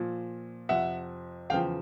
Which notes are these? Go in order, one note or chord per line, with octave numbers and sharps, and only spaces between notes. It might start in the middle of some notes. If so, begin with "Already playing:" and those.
Already playing: A#2 F3
F2 C3 F3 E5 F#5
E2 C#3 F3 F5 G5